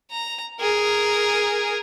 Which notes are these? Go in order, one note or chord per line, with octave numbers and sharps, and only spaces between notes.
A#5
G#4 A#4